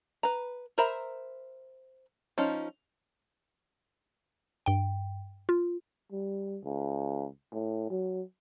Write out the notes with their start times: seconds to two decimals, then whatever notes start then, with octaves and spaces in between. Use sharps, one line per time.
0.23 B4 A#5
0.78 A#4 C5 E5 A#5 B5
2.38 F3 C#4 D#4
4.66 G2 G5
5.49 F4
6.12 G3
6.64 C#2
7.53 A2
7.90 F#3